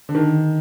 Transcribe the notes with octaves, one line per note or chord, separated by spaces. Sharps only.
D3
D#3